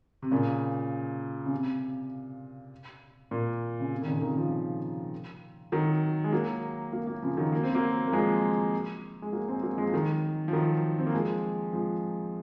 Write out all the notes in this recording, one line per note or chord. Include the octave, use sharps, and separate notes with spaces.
C3
A#2 C#3
C#3
C3
A#2
C#3
C3
D#3
A#2 C#3
C3 D#3
C#3 F3
D#3 F#3
G#3
F#3 A#3
F#3 A#3
F#3 A#3
C#3 F3
D#3 F#3
A#3
C4
F#3 A#3
A#3
F3 G#3
G#3
F#3 A#3
G#3 C4
F#3 A#3
F3 G#3
F3
D#3 F#3
F3
D#3 F#3
C4
A#3
F3 G#3
F3 G#3